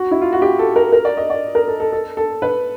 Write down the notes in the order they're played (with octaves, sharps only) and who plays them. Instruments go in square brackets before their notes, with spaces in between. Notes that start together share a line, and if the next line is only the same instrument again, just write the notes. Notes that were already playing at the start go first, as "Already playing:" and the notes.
Already playing: [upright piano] F#4
E4
F4
F#4
G4
A4
A#4
A#4
D5
D#5
D5
A#4
A4
A4
A4
A4
B4